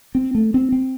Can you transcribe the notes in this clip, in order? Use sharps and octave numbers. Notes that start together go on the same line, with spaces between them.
C4
A3
C4
C4